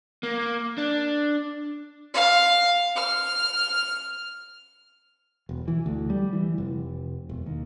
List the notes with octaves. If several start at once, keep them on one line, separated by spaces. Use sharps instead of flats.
A#3
D4
F5
F6
E1
E3
D2
G3
E3
F1
E1
D#2